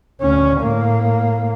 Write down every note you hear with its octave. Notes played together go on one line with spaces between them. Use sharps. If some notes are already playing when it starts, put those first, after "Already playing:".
D2 C#4
A2 A#3